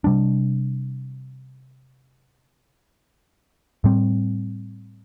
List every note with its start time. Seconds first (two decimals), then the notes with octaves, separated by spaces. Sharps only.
0.04 C3 G3 D4
3.84 A2 G3 C4